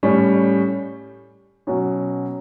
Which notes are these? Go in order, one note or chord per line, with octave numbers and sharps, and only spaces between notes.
A2 G3 C#4
B2 F#3 C#4